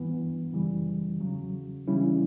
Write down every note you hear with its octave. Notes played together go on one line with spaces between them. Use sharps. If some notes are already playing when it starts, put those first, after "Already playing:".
Already playing: G2 E3 B3
F#2 C#3 E3 G3
E2 C#3 F#3
C#3 E3 G3 C#4 E4